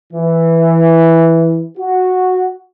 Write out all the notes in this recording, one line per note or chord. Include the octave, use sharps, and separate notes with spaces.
E3
F#4